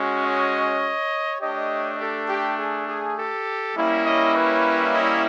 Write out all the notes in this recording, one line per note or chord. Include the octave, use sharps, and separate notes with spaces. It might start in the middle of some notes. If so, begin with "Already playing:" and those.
Already playing: G#3 C#4 F#4
C#5 D#5
A3 D4 G4 C#5 D#5
G4 A4
G4
G#4
G#4
G4 A4
G3 A#3 C#4 E4
C#5 D#5
B4 C#5
C#5 D#5